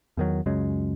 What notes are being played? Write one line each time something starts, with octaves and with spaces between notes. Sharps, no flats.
E2 D#3 F#3
C#2 F#2 C#3 G#3